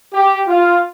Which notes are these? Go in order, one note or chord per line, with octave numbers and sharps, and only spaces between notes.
G4
F4